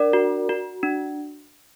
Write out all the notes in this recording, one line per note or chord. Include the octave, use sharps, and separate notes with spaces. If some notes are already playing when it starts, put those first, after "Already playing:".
Already playing: D4 A#4 D5
F#4
F#4
D4